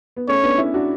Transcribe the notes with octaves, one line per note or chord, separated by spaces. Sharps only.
B3
A3 C#4 C#5
B3 D4
C#4 E4
D4 F#4